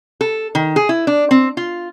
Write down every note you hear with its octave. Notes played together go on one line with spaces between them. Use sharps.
A4
D#3
G#4
E4
D4
C4
F4